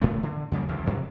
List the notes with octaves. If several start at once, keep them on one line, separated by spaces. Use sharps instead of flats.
A2 A3 B3
D3
F2 C#3 G3 A#3
A1 D2 G2 E3
G2 C3 D#3